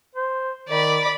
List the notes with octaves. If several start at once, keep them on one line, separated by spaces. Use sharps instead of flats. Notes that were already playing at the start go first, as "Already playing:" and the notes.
C5
D#3 D5 B5